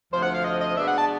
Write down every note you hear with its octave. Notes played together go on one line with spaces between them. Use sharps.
D2 C3 F3 C5
F#5
F5
D#5
D#5
B2 G#3 B3 D4 E5
F#5
A5